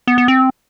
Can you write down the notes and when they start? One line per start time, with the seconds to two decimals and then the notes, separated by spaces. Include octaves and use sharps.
0.07 B3
0.18 B3
0.28 C4